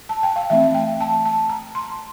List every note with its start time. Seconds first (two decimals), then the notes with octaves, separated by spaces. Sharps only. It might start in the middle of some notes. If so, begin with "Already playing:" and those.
0.09 A5
0.23 G5
0.36 F5
0.50 E3 A3 C4 E5
0.74 G5
1.00 A5
1.25 A5
1.49 A#5
1.75 C6